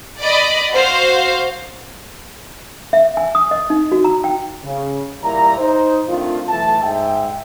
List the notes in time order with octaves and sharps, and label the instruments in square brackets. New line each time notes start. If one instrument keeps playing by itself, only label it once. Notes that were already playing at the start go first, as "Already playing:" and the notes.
[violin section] D5 D#5 B5
F#4 C5 F5
[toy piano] E5
G#5
D#6
D#5
D#4
F#4
A#5
G5
[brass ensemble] C#3
A#2 G3 E4 A#4 A#5
D#4 C5
D#3 A3 C4 D4 F4
B1 E3 A3 A5
G#2 E5 G5